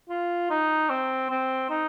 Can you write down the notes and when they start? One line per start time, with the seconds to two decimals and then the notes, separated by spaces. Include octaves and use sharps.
0.09 F4
0.50 D#4
0.90 C4
1.30 C4
1.70 D#4